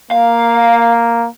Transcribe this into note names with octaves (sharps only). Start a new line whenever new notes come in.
A#3 F5